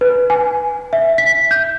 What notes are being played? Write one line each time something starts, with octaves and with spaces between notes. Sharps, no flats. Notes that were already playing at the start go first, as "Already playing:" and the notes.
B4
G#5
E5
B6
G6